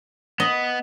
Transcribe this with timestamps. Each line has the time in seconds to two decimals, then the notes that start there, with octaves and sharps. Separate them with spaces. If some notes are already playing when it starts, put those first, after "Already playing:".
0.40 B3 D#5